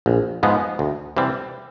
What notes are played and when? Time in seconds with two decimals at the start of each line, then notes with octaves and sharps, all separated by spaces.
0.06 A#1
0.43 G#2 F3 G#3 B3
0.79 D2
1.17 C3 E3 G3 C4